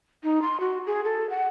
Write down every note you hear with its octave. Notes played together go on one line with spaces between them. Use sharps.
D#4
C6
F#4
G#4
A4
F#5